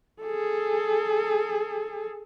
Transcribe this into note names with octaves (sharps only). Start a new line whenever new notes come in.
G#4 A4